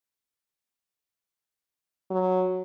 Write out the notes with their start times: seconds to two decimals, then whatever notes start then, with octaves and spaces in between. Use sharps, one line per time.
2.11 F#3